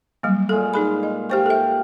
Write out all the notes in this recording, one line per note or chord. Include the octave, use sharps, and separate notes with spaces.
F#3 G3 A#3
A#2 G#3 A4 F5
D#4 G#4 B5
D#5
G4 C5 F5 G5 C#6
A4 E5